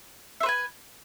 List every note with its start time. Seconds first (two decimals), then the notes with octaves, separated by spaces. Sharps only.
0.40 E5
0.43 C5
0.46 B4
0.49 G#5